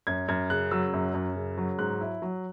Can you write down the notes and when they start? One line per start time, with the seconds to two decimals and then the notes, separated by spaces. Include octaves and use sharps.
0.07 F#2 G#6
0.28 F#2 G#6
0.50 C#3 F#6
0.71 F#3 E6
0.94 F#2
1.14 F#2
1.36 C#3
1.58 F#3
1.79 G#2 F#6
2.01 E4
2.22 F#3